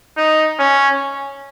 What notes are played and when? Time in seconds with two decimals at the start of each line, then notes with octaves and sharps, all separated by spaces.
0.17 D#4
0.59 C#4